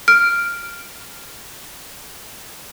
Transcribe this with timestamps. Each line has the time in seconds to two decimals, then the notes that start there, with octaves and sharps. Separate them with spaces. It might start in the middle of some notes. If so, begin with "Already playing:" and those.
0.08 F6 D7